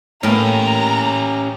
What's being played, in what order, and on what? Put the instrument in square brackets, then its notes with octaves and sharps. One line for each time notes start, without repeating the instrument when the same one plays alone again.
[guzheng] A2 A#4 [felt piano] A3 A#3 [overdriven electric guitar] C#4 G4 [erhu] A#5